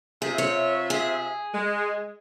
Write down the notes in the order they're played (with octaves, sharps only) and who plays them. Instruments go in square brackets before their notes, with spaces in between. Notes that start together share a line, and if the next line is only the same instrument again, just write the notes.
[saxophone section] C3 F4 E5 [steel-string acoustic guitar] G#4
[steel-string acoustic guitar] C#5
G#4
[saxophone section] G#3